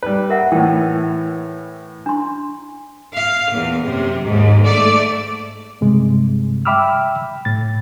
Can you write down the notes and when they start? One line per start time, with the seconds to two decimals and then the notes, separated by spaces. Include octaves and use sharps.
0.03 G3 B4
0.30 A#4 E5 F#5
0.52 A2 E3 G5
2.06 D4 C6
3.13 F5
3.51 E2 A#2
3.82 F#2 C3
4.23 D#2 G#2
4.62 G#2 A3 D5
5.81 G2 C3 G#3
6.65 E5 G5 B5 D6 E6 F6
7.45 A2 A6